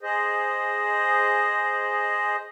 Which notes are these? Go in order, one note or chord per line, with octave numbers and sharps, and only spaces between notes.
G#4 C5 D#5